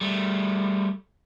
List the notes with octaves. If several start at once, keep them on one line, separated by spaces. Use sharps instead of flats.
G3 A3